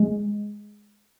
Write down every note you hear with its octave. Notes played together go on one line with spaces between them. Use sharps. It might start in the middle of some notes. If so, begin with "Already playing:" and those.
Already playing: G#3